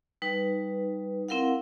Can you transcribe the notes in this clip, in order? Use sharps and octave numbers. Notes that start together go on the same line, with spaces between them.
G3 D#4 B4
C4 E4 A#4 F5 F#5